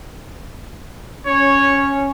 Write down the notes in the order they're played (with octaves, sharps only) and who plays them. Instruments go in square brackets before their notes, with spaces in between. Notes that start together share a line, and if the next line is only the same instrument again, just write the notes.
[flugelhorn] C#4 [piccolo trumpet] C#5